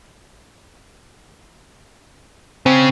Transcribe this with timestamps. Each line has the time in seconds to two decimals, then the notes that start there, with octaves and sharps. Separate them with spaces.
2.66 C#3 C4